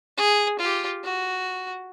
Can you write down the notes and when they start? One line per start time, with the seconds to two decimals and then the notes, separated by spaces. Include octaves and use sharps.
0.17 G#4
0.59 F4 G4
1.04 F#4